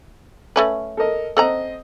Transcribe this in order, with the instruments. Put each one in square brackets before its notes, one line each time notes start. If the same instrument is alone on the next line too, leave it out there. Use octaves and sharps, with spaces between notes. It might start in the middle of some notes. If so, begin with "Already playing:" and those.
[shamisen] A3 C#4 B4
[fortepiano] A4 A#4 D#5
[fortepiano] C4 D#5 [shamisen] A4 F#5 A#5